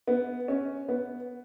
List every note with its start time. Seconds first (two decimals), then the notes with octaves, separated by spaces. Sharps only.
0.07 B3
0.48 C#4
0.89 B3